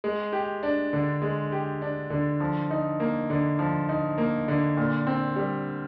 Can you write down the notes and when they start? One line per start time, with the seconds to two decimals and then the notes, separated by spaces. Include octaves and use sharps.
0.04 G#3
0.32 G4
0.63 D4
0.93 D3
1.22 G#3
1.52 G4
1.82 D4
2.10 D3
2.40 F3
2.71 D#4
3.00 A#3
3.30 D3
3.59 F3
3.89 D#4
4.18 A#3
4.48 D3
4.77 A#2
5.07 C4
5.36 G3